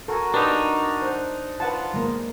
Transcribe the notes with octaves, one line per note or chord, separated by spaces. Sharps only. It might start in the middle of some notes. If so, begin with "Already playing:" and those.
F#4 A4 A#4 G#5
D4 D#4 G4 B4
C5 F#6
F4 B4 F#5 A5
G#3 A#3